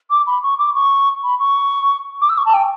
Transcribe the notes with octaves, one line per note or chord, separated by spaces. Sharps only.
D6
B5
C#6
D6
C#6
B5
C#6
D6
E6
C#6
A5
G5